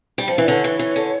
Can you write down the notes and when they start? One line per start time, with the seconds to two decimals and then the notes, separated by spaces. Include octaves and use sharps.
0.18 G3
0.28 F3
0.38 E3
0.43 D5
0.48 D3 C#5
0.64 E3
0.79 E3
0.96 D3